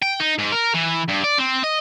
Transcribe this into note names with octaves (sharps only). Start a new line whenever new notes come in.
G5
D#4
G#2
A#4
E3
G2
D5
C4
D#5